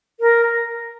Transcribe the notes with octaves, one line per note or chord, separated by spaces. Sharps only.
A#4